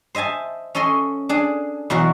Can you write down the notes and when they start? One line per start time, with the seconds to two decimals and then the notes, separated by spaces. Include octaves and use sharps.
0.15 C5 D#5 E5 G#5 A5
0.75 C#4 A4 C#5 D#5 C6
1.29 D4 G#4
1.90 E2 B2 F#3 F#4 A#4